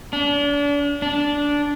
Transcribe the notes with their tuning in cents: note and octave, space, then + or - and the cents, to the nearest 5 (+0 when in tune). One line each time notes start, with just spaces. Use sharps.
D4 -35
D4 -10